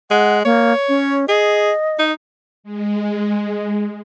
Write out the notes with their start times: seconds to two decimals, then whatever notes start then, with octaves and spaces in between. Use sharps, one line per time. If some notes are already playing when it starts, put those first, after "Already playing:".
0.10 G#3 F#5
0.45 A#3 C#5
0.89 C#4
1.28 G#4 D#5
1.99 D#4
2.64 G#3